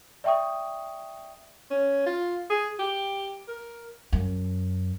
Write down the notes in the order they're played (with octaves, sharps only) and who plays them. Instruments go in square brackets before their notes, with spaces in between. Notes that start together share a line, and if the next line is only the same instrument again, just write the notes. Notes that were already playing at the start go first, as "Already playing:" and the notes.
[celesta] D5 E5 G5 C#6 D#6
[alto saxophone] C#4
F4
G#4
G4
A#4
[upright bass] F#2